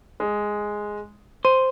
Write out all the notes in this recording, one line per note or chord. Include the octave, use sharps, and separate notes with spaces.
G#3
C5 D#7